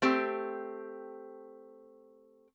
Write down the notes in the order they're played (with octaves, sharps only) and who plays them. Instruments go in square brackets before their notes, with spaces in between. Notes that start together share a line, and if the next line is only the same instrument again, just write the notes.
[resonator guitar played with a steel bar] A3 C4 G4